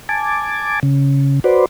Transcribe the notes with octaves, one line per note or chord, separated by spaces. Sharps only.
G#5 A5 D6
C#3
F#4 B4 C5 D5